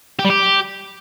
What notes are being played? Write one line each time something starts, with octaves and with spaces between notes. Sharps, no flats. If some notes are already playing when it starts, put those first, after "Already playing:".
G4
G3
G4